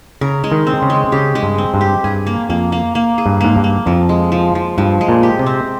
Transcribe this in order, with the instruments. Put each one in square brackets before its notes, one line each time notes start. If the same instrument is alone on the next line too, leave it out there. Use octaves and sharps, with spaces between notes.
[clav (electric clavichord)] C#3 [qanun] A#4
[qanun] G#3
[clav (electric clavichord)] D#3
[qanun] C4
[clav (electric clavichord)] C#3
[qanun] G#3
[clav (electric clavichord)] C#3 [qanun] G4
[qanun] G#3
[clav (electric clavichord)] G2
[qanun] C4
[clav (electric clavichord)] G2
[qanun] G4
[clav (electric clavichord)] G2 [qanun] G#4
[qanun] A#3
[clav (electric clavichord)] F2 [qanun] A#3
[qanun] A#3
A#3
G#4
[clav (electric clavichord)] G2
[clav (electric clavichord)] G#2 [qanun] A#3
[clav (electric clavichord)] G2
[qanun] A#3
[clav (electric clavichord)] F2 [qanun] F3
[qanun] G#3
F3
F3
[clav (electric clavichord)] G2 [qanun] F3
[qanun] G#3
[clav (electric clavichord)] A#2
[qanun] G4
[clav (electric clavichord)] C3
[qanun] C4